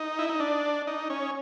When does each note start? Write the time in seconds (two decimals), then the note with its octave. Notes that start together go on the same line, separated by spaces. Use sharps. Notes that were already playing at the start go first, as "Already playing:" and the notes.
Already playing: D#4
0.19 E4
0.29 D#4
0.40 D4
0.87 D#4
1.10 C#4